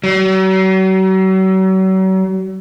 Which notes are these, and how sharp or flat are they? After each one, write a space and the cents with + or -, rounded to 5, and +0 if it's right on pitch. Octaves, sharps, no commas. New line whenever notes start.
F#3 +40